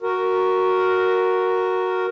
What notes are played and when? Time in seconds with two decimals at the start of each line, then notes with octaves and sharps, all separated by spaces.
0.02 F#4 A#4